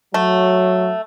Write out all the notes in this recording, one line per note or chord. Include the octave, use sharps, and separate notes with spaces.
F#3 A3